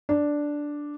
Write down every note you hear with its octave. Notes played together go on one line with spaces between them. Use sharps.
D4